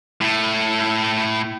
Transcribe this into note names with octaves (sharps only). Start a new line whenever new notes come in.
A2 A3